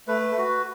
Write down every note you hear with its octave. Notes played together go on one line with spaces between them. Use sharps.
A3 B4
F#4